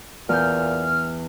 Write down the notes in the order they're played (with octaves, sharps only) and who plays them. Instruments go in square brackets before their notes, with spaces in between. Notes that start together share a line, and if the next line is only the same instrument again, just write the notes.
[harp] E2 G6 [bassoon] A#2 [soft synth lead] F6